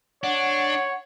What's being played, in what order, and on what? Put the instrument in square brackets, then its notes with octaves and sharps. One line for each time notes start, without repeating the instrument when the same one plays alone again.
[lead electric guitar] D4 [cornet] C#5 [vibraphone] F#5